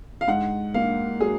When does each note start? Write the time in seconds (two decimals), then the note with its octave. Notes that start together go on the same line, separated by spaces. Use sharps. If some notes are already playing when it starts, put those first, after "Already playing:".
0.21 F5
0.28 G#2 F#5
0.74 A#3 F5
1.20 F#3 G#4